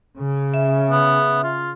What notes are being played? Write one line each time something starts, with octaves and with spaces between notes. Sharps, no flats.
C#3
E5
B3
F4